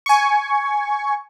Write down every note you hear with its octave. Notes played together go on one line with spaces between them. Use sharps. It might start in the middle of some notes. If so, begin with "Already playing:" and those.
G#5 C#6